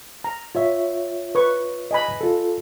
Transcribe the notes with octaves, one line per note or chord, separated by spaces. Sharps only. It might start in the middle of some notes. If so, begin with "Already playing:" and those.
A#5
F4 C#5 E5
B4 C#6
D#5 G#5 B5
F4 A4